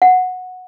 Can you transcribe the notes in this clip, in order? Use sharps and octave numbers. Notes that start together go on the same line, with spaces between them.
F#5